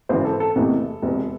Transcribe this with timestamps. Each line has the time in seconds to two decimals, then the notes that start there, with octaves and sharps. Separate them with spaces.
0.09 G#1 F#2 C#3 E3 C4 C5
0.25 A4
0.40 A4
0.55 F#1 E2 C3 E3 A3
1.02 E1 E2 C3